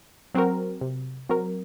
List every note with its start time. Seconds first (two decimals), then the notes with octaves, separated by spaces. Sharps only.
0.34 F#3 C4 F#4 A#4
0.81 C3
1.29 F#3 C4 F#4 A#4